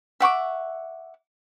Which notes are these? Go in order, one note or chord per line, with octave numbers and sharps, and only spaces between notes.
E5 F#5 C#6 D6